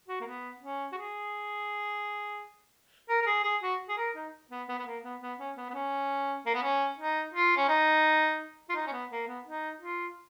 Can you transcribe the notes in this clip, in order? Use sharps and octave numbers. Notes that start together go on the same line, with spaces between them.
F#4
A#3
B3
C#4
F#4
G#4
A#4
A#4
G#4
G#4
F#4
G#4
A#4
D#4
B3
B3
B3
A#3
B3
B3
C#4
B3
B3
C#4
A#3
B3
C#4
D#4
F4
C#4
D#4
F4
D#4
C#4
B3
A#3
B3
D#4
F4